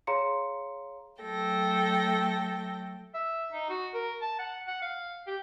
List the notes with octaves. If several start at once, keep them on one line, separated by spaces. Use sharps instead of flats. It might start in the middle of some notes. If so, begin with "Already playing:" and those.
G#4 C#5 F5 A#5 C6 C#7
F#3 A3 A4 G5 A#6
E5
D#4
F#4
A#4
A5
F#5
F#5
F5
G4